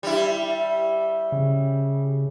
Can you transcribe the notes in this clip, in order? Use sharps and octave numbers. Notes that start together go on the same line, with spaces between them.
G3 E4
C#3